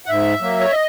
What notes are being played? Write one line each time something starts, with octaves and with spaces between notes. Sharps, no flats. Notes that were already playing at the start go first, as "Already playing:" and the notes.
F#5
G#2 E5
F#3 A#3
C#5
D#5